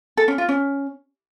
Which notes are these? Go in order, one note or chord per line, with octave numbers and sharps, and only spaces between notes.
A4
C#4
F4
C#4